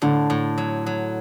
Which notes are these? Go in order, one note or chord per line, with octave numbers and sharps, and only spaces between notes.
A2 D3
A2
F#3
F#3